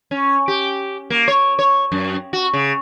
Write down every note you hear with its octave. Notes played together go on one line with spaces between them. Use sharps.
C#4
G4
A#3
C#5
C#5
F#2
F#4
C#3